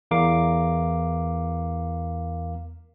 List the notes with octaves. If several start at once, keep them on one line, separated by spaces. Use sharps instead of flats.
E2 A#4 F5 D6